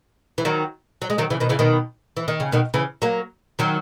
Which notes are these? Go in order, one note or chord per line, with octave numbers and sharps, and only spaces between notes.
E3
D#3 F#3
F#3
G#3
D#3 F#3
C#3 E3
B2 D#3
C#3 E3
B2 D#3
E3
D#3
C#3
B2 D#3
C#3 E3
F#3 A#3
D#3 F#3